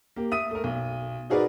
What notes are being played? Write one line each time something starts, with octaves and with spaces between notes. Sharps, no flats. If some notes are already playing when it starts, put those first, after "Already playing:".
A#3 G4
E5 D#6 D#7
A3 A#4
B1
D#4 F#4 G#4 A#4 B4 D5